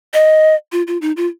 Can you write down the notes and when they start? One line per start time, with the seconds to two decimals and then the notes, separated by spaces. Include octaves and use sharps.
0.14 D#5
0.72 F4
0.87 F4
1.02 D#4
1.17 F4